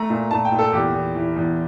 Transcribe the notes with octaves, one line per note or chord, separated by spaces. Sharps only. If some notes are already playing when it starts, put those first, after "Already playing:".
Already playing: A3 A#5
A#2
A#2 A5
G5
A#2
A4
E2 G4
E2
E3
E2